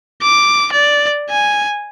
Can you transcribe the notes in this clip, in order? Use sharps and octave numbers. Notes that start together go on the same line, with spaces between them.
D6
D5
G#5